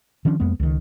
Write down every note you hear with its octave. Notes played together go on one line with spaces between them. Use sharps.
D#3 F3 C#4 D4
F2 G#3 A#3 B3
C#2 D#3